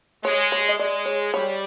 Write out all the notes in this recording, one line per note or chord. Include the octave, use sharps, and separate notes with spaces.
G#3 C#5
C#5
D#5
G#3 D5
C#5
G3 C#5